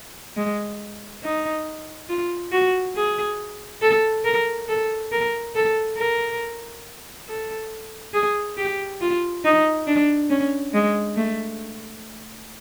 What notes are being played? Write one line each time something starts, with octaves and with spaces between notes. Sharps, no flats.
G#3
D#4
F4
F#4
G#4
A4
A#4
A4
A#4
A4
A#4
A4
G#4
G4
F4
D#4
D4
C#4
G#3
A3